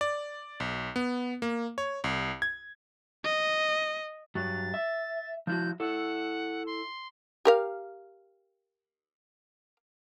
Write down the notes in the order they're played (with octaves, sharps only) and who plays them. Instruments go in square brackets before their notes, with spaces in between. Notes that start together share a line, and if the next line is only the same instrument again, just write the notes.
[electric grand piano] D5
B1
B3
A#3
C#5
C2
G#6
[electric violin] D#5
[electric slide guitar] G2 F#3 [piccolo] A6
[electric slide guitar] E5
[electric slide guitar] F3 E4 F#4 [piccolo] G6
[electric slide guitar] E4 A4 [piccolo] F#5
[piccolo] C6
[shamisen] G4 A#4 F5